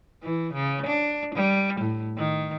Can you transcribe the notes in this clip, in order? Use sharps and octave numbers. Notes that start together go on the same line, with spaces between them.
E3
C#3
D4
G3
A2
D#3